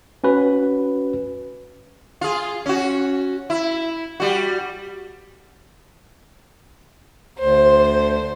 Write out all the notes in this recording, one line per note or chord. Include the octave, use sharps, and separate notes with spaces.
C#4 F#4 B4
F4 G#4
C#4 F#4
E4
G3 F#4
D2 C5